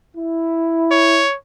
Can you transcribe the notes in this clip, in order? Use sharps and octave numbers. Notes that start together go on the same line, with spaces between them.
E4
C#5